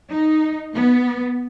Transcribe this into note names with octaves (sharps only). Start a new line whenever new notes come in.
D#4
B3